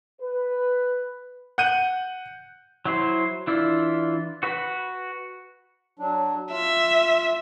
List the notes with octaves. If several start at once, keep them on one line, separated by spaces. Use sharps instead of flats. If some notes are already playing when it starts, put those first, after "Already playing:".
B4
F#5 F#6 G6 D#7
F#3 E4 C5
E3 D4 E4 F4
F#4 B4 B5
F#3 D4
F4 E5